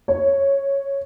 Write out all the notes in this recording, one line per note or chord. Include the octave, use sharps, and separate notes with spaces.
C#5